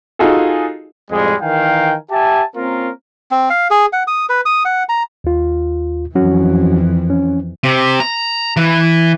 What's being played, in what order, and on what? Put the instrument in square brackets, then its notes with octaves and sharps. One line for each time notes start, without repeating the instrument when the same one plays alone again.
[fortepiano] D#4 F4 F#4 G#4 A4
[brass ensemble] F2 A2 G3 G#3
D#3 E3 A#4 F5 G5 G#5
G4 E5 G#5 A5
A#3 C4 C#4 F4 A#4
[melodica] C4
F5
G#4
F#5
D#6
B4
D#6
F#5
A#5
[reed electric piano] D#2 F4
[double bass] F2 E3 [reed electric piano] F#3 C#4 F#4
[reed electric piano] C#4
[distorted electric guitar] C3
A#5
E3